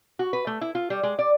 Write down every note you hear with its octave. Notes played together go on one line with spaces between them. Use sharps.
F#4
B4
A3
E4
F4
G3
G#3
D5